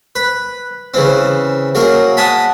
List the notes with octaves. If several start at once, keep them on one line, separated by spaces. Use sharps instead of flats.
B4
C#3 E3 C4
F#3 A#3 G#4
D#5 F#5 G#5 A5 B5